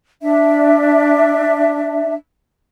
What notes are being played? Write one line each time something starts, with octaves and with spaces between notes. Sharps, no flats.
D4 E5